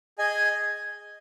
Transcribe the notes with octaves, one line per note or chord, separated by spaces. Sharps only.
G#4 D#5 G#5